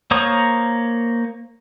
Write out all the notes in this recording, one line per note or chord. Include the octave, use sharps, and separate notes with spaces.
A#3 C5 C#5 A#5 D#6